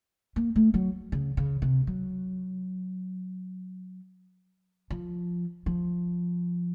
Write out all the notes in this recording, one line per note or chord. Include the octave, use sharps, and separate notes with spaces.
A#3
A3
F#3
C#3
C#3
C3
F#3
F3
F3